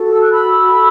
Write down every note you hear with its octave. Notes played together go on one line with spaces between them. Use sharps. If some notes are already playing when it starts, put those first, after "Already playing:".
Already playing: F#4 A4
E6
F#6
A4 B5 E6
F#4